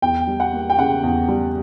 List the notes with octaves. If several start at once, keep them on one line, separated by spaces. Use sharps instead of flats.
E2 G5
G3
F#5
A#3
G5
C#3 F#5
E2
G3